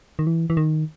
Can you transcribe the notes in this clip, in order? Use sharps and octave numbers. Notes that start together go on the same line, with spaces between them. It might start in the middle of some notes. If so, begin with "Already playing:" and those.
D#3
E3
E3
D#3